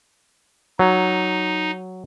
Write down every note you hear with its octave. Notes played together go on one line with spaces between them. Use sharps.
F#3 D#4